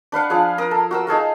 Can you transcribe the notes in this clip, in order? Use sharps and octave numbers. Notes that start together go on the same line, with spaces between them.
D4 B4 F5 F#5
F3 D4 G#4 F5
A#4 D#6
A4
F#4 A#4 E6
D#4 G#4 A4 F5